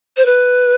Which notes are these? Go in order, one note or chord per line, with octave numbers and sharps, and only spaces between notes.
C5
B4